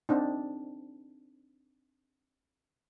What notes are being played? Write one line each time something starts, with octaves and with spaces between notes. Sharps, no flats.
C4 D4 D#4